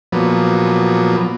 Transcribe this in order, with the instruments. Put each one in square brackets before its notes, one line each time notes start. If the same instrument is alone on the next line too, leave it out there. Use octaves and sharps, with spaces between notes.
[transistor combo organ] A#2 F3 F#3 B3